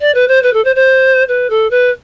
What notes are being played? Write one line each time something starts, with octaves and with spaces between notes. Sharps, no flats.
D5
B4
C5
B4
A4
C5
C5
B4
A4
B4